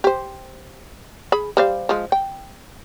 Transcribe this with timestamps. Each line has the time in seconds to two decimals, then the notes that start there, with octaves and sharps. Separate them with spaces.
0.04 G4 C5
1.32 G#4 B5
1.57 G3 C5 F5
1.89 F3 G#3
2.12 G5